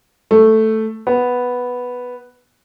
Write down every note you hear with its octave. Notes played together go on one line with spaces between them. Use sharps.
A3
B3